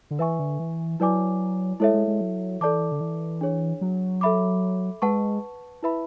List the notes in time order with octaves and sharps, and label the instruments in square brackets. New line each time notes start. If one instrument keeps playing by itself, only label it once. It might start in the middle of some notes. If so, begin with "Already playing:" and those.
[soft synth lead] D3
[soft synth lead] E3 [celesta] B4 E5 G#5 C#6
[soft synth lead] D3
E3
[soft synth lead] F#3 [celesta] E4 B4 D5 G#5 D6
[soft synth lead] G#3 [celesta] E4 A4 C#5 E5
[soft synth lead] G#3
G#3
F#3
[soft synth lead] E3 [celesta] A4 D5 A5 D6
[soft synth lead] D3
E3
[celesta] D4 G#4 C#5
[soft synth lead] F#3
[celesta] A4 E5 B5 D6
[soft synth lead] G#3 [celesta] B4 F#5 A5 C#6
[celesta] E4 B4 E5 B5